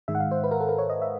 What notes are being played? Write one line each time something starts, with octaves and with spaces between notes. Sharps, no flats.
G#2 D#3 G#3 E5
F#5
F5
C5
B4
A#4
A4
A#4
C#5
D#5
E5